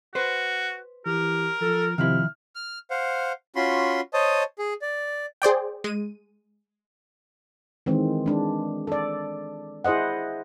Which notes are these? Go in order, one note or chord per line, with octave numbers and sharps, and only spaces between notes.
F#4 B4 C5
E3 G4 A#4
F3 A4
C3 D#3 F3 E4 F6
F6
C5 F5 F#5
C#4 F4 F#4 B5 C6
C5 C#5 D#5 A5 D#6
G#4
D5
G#4 C5 D5 G5
G#3 D#7
D#3 E3 G#3 C4
G#3 D4
A4 D5
E4 G#4 C5 D#5 F#5